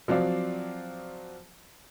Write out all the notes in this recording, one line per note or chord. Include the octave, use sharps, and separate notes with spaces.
F3 F#3 C4 D5 F5